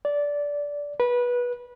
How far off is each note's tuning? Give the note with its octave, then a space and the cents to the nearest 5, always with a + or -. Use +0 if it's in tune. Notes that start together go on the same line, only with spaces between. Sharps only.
D5 -15
B4 -20